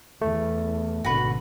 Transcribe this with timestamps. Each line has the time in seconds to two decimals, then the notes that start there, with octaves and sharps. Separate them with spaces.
0.22 E2 A3
1.05 G#1 B2 D3 F#4 B4